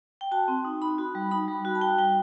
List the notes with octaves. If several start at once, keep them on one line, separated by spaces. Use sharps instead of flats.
G5
F#4 A5
C4
D#4
D#4 B5
F#4
G3
D#4 B5
G3
F#4
A5
F#4 G5
G3 G5